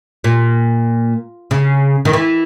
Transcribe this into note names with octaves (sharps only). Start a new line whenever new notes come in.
A#2
C#3
D#3
E3